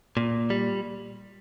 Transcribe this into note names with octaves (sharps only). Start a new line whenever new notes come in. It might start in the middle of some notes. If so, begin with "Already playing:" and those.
A#2
G3